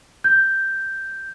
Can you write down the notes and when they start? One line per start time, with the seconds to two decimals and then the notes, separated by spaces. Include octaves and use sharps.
0.24 G6